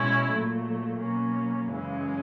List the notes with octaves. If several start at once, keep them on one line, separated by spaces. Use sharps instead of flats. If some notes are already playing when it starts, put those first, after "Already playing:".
Already playing: B2 G#3 C#4 E4
A#2 F#3 A3
B2 F#3 A#3 C#4
F#2 C#3 E3 G#3 C#4